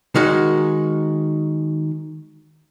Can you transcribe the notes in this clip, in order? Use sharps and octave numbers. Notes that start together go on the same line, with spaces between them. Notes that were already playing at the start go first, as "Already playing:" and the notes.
D#3 G#3 F#4